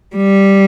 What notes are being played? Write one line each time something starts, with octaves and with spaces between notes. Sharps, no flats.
G3